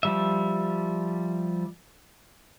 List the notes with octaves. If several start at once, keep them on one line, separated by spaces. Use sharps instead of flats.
F3 G3 E5